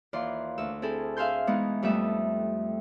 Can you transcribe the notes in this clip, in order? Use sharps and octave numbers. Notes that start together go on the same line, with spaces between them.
D#2 E3 F4 D5 C6
D2 E6
C4 E4 G#4 A4
G#4 E5 F5 G#5 C6 G6
E3 G#3 B3 D#4
F2 G3 A3 E5 D#6